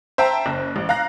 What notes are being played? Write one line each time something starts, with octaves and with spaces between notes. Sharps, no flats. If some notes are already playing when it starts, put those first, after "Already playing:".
C5 E5 G5 A5 A#5
F#1
A1
F5 A#5 F#6 A#6